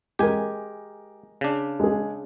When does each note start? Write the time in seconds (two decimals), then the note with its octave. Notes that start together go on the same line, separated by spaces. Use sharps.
0.19 G#3 G4 A#4 G#5
1.41 C#3 D4
1.80 G#3 G#4